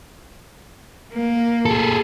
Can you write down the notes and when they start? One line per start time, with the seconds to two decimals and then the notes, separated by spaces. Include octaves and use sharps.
1.13 A#3
1.65 G#4 A4